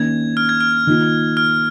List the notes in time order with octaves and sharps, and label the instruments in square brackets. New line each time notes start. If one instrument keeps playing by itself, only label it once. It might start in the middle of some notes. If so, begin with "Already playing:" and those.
Already playing: [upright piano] D#3 A#3 C#4 [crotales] G#6
[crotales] F6
G#6
F6
[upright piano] D#3 A#3 F4
[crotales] F6